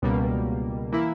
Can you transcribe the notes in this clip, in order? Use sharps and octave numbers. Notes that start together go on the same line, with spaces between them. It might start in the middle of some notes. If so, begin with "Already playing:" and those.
C#2 B2 G3 A#3
E3 A#3 E4